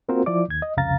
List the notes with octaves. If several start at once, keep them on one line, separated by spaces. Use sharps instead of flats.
A#3 C4 F4 F#4 A#4 C5
F3 E4 D5 D6
D#2 G#6
D#5
C2 F2 C#3 F5 A#5 A6